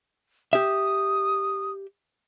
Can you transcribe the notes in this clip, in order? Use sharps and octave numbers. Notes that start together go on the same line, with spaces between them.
G4 E5 D#6